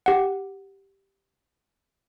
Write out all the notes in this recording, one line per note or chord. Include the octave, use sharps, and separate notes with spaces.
G4 F#5